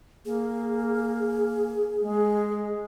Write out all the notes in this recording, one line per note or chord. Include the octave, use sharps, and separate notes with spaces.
A#3 G#4
G#3